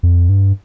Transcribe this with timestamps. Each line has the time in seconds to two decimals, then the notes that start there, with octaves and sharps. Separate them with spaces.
0.03 F2
0.29 G2